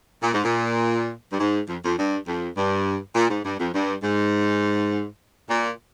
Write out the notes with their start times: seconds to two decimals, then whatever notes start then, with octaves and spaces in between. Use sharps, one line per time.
0.23 A#2
0.34 G#2
0.45 A#2
1.33 G2
1.40 G#2
1.69 F2
1.85 F2
1.98 G2
2.27 F2
2.57 G2
3.15 A#2
3.30 G#2
3.45 G2
3.60 F2
3.74 G2
4.03 G#2
5.50 A#2